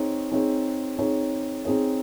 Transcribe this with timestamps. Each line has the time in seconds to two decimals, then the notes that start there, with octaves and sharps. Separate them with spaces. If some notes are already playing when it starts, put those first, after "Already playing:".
Already playing: C4 D#4 G#4 C#5
0.32 C4 D#4 G#4 C#5
0.99 C4 D#4 G#4 C#5
1.65 C4 D#4 G#4 C#5